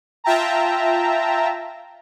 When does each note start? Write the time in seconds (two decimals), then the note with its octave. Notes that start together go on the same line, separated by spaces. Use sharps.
0.24 F4 E5 G5 A5 A#5